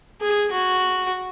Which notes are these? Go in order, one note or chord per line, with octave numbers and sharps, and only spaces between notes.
G#4
F#4